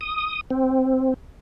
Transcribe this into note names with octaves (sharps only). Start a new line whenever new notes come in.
D#6
C4